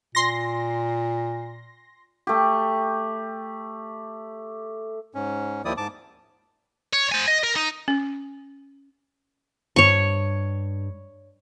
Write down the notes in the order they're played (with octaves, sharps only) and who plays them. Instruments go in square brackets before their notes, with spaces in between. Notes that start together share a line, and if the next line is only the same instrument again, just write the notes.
[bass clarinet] A#2 [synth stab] C6 A#6
[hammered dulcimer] A3 G4
[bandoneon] G#2 C#4
D#2 D#3 F3 E4 D5 D#6
G#2 A5 D6
[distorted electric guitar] C#5
C5 G#5
D#5
A#4
D#4
[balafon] C#4
[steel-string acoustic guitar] G2 [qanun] C#5 C#6